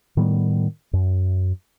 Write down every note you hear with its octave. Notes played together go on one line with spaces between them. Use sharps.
A2 D#3 G3 B3
F#2